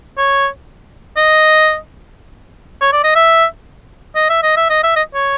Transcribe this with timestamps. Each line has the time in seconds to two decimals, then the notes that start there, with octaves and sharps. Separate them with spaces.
0.17 C#5
1.16 D#5
2.81 C#5
2.93 D5
3.04 D#5
3.15 E5
4.15 D#5
4.30 E5
4.43 D#5
4.57 E5
4.70 D#5
4.83 E5
4.96 D#5
5.14 C#5